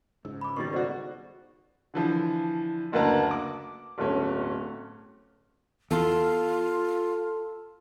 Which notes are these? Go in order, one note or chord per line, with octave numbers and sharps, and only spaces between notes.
C#2 G#2 E6
B5 D6
B2 D#3 G3 C#6 A6
B2 F#4 A4 C5 D5
D3 E3 F3
F#1 D2 A#3 B4 A5 A#5
D6
D1 G1 A3 C#4
E2 F4 A4 A5 C6